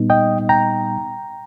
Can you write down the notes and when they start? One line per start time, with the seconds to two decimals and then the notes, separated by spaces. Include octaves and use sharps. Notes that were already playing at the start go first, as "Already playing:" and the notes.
Already playing: A#2 G3 B3 D#4
0.10 D#5 G5
0.49 G5 A#5